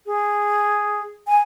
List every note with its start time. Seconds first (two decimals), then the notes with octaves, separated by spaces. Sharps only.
0.06 G#4
1.27 G#5